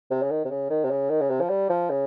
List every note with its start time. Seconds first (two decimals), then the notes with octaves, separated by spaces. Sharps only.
0.11 C3
0.22 C#3
0.31 D#3
0.44 C3
0.51 C#3
0.70 D#3
0.84 C3
0.90 C#3
1.10 D#3
1.20 C#3
1.30 C3
1.40 F3
1.49 G3
1.69 F3
1.90 C#3